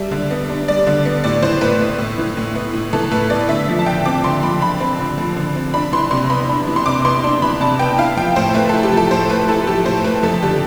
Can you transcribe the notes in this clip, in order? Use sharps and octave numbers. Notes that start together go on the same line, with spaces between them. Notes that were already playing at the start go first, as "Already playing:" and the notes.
Already playing: G3 D4 E5
D3
B3
D4
G3 D5
D3
B3
A2 D5
E3 C5
A2 B4
B3
A2
E3
A2
B3
A2
E3 A4
A2 B4
B3 D5
D3 E5
F3
A5
D3 G5
C4 D6
D3 C6
F3 B5
D3 B5
C4
D3
F3
D3
C4
D4 B5
E3 C6
C3 C6
B3 B5
D4
E3
C6
C3 D6
B3 C6
D4
E3 B5
C3 A5
B3 G5
E4 F5
F3 G5
A2 C5
A3 B4
E4 A4
G4
F3
A4
A2 C5
A3 B4
E4 A4
F3 G4
A2 C5
A3 B4
F2 A4
D3 G4